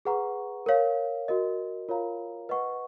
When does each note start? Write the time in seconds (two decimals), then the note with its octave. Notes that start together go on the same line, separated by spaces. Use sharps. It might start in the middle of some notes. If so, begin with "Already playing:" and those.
0.05 G#4 B4 F#5 A#5 C#6
0.66 A#4 C#5 F5
1.28 F#4 A#4 D#5
1.89 F4 A#4 C#5 F5 A#5
2.49 B4 D#5 F#5 C#6